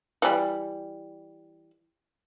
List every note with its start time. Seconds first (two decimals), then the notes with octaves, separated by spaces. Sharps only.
0.22 E3 G3